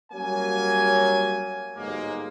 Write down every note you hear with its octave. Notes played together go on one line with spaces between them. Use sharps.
F#3 G3 A#3 C#4 G#5
G1 G#2 F#3 G#3 A#3